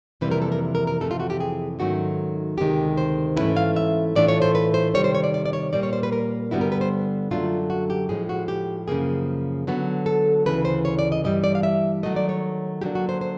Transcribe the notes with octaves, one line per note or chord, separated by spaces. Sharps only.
F2 C3 E3 G3 A#3 B4
A#4
A4
A#4
A#4
A#4
F2 C3 E3 A3 A4
F4
F#4
G4
G#4
G#2 D#3 F#3 A3 C#4 F#4
D2 C3 D#3 G#3 G4
C5
G#2 E3 A3 C#4 E4 B4
F5
E5
A2 E3 A3 D4 F4 D5
C#5
C5
B4
C5
C3 D#3 G3 C#5
C5
C#5
D5
D5
D5
C#5
A#2 G3 A#3 D5
C#5
C5
B4
A#4
G2 D3 G3 B3 E4 F#4
A#4
B4
C5
F#2 D3 F#3 A3 D4 F4
F#4
G4
A2 F3 G#3 G#4
F#4
G4
F#2 C#3 F3 A#3 G#4
D3 F#3 B3
A4
D2 C#3 E3 B4
C5
C#5
D5
D#5
G2 E3 G3 D#5
D5
F5
E5
D#3 F#3 A3 D#5
D5
C#5
D3 F#3 A#3 D4 G4
F#4
C5
C5